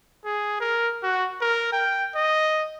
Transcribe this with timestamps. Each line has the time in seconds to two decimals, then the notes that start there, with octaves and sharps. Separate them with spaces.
0.25 G#4
0.60 A#4
1.03 F#4
1.41 A#4
1.72 G5
2.15 D#5